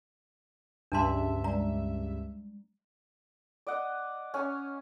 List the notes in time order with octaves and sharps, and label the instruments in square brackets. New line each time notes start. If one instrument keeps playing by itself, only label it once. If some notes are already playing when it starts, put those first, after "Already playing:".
[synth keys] C#2 G2 E5 [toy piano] D4 A5 C6
[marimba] G3 G#3 D5 [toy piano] A#5
[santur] D5 D#5 F#5
C#4 G#5 A#5 C#6